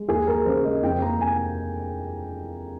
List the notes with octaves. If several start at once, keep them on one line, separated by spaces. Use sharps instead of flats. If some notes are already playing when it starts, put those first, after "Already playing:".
Already playing: G#3
D#2 G#4
D#2 A#4
C#3 C5
G#3 D#5
F2 G5
A#3 A#5
C3 G#5